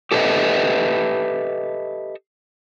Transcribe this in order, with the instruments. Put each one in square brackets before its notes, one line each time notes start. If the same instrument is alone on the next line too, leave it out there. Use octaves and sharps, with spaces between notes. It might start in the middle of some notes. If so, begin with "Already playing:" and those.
[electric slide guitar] G4 A4 B4 C#5 D#5 E5